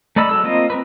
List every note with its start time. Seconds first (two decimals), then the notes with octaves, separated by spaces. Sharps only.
0.16 A3 D#4 D5 B5 E6
0.29 F#3 G#3 A4 E6
0.44 A#3 C4 F4 D#5
0.70 C4 A#4 B4